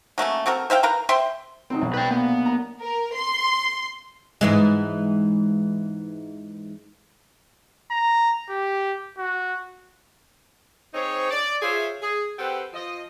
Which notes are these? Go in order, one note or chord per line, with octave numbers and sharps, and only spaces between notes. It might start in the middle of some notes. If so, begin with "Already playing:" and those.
F#3 A3 A#3 C#4
C4 F#4 A4 A#4
C5 E5 F5 G5
A#4 B4 F5 A#5
C5 E5 G5 C6
C3 F#3 G#3 C4 D#4
B1 G3 C#4 D4
C3 B4 G5
A#3 B3 G#5 C6
A#5
A#4
C6
G#2 E3 G#3
A#5
G4
F#4
C4 D#4 G#4 C5 C#5
D5
F4 G#4 C5 C#5 E5
G#4
C4 G4 A4 B4 C5 F#5
F3 D#5